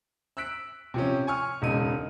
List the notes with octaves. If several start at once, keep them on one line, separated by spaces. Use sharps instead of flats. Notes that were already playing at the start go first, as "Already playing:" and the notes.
E6 F#6 B6 D7
C3 F3 C#4
G#5 C#6 F6
E1 C#2 C#3 D#4 D#7